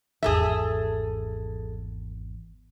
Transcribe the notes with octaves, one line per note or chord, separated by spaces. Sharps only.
G#1 E2 G#4 A4 E5